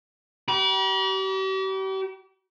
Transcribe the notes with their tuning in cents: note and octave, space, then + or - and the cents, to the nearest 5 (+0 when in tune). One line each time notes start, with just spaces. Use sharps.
G4 -40 B5 -45